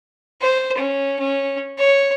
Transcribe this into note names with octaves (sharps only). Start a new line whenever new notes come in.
C5
C#4
C#4
C#5